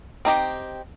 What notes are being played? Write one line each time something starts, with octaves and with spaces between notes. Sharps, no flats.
C4 D#4 G4